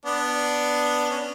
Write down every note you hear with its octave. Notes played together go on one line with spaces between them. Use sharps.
B3 D4
C#4